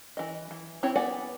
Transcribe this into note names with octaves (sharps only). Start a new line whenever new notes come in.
E3 D#5
E3
C4 E4 C#5
B3 D5 F#5 G#5